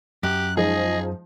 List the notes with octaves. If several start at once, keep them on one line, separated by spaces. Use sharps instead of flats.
F#2 G4 F#6
F3 G#3 D#4 G#4 D#5